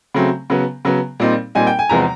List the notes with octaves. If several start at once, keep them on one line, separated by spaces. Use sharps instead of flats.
C#3 F#3 A3 C4
C#3 F#3 B3
C#3 F#3 B3
A#2 G3 C4 D#4
A#2 G3 C4 D#4 G#5
G5
G#5
E2 C3 F3 G#3 B3 A#5